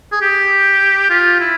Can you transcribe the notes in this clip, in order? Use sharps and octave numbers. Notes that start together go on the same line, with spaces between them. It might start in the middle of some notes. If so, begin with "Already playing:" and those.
G#4
G4
F4
E4